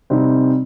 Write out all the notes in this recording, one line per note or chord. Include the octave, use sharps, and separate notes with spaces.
C3 G3 C4 D#4